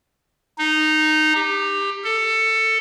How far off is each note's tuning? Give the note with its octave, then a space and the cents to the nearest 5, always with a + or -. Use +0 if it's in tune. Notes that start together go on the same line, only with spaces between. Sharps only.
D#4 -10
G4 +20
A4 +15